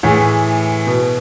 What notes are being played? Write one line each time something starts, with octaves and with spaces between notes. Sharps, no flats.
A2 E3 G#4
B2